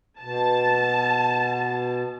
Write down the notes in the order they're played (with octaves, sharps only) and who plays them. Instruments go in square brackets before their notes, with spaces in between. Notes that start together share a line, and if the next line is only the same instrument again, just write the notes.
[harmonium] B2 [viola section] A5